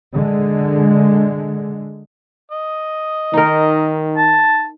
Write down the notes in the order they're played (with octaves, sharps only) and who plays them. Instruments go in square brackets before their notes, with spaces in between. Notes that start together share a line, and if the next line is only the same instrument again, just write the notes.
[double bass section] D3 G#3
[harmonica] D#5
[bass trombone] D#3 [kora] D#4 A#4
[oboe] A5